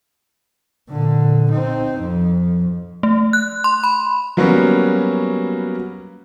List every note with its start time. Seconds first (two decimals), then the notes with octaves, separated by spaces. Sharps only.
0.89 A#2 D3
1.51 C4 D#4
2.00 F2
3.03 A3
3.33 F#6
3.64 C6
3.84 B5
4.37 F#3 G3 A#3 B3 C#4 F#4